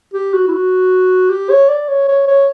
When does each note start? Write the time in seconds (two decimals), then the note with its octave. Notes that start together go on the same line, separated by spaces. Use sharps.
0.14 G4
0.34 F#4
0.48 E4
0.53 F#4
1.30 G4
1.50 C#5
1.69 D5
1.88 C#5
2.08 C#5
2.28 C#5